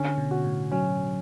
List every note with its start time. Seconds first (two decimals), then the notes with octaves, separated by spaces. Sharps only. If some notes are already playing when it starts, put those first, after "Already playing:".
Already playing: D3 C#4
0.18 B2
0.31 F#4
0.44 A2
0.71 F#3 C#4